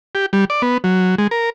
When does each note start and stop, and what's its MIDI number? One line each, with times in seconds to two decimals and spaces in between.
0.15 0.26 67
0.33 0.45 55
0.50 0.62 74
0.62 0.78 59
0.84 1.15 54
1.18 1.27 56
1.31 1.50 70